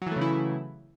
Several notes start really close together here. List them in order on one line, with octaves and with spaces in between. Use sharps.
F#3 E3 A3 C#3 E4